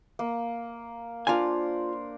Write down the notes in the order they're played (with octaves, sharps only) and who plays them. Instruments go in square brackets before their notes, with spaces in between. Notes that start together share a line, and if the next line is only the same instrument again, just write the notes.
[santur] A#3
[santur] D4 A#4 C5 [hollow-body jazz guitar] F4 G#5